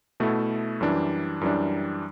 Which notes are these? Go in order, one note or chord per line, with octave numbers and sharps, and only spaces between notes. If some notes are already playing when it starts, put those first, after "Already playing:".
B2 A3 E4 A4
F#2 E3 G3 D4
F#2 E3 G3 D4